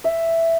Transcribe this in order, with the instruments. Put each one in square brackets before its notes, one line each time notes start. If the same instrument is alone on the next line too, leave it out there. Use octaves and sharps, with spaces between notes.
[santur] E5